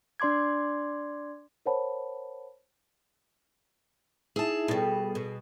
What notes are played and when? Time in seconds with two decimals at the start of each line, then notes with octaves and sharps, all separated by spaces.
0.20 D4 D5 C6 D6 G#6
1.66 A#4 C5 C#5 F#5 A5 B5
4.36 D#4 E4 G#4 E5 A5
4.68 B2 G3 B3 A4
5.15 B2